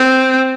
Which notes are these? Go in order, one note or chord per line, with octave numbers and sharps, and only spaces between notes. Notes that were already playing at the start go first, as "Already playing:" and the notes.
Already playing: C4